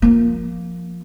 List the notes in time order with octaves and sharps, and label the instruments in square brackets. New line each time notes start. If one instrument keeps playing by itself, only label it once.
[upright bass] F3 A#3